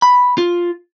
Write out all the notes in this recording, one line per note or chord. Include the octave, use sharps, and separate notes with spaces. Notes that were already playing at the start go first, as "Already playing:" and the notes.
B5
F4